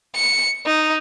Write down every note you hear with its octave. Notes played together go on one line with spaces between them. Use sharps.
C#7
D#4